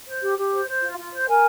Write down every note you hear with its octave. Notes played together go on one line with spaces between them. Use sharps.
C5
G4
G4
C5
C5
F4
F4
C5
A#4 G#5